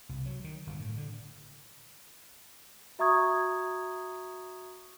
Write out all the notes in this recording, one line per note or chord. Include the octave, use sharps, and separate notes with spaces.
C2
F#3
D#3
G1
A2
D3
F#4 E5 A#5 C#6 D#6 G#6